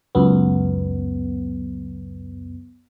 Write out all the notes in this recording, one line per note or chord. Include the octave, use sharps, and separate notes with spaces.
C#2 F#2 B3